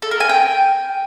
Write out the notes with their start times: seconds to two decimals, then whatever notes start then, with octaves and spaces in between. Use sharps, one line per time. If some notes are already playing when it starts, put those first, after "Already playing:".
0.02 A4
0.11 A#4
0.20 G#5
0.29 G5